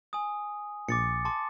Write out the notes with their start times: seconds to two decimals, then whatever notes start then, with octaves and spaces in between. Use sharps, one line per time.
0.13 G#5 D#6
0.89 A#1 D6 A6 C#7
1.25 A5 C6 D6